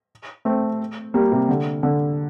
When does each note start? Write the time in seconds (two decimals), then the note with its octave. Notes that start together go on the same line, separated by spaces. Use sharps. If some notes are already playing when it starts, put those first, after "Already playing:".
0.45 A3 C4
1.14 G3 A#3
1.32 C3
1.49 D3
1.83 D3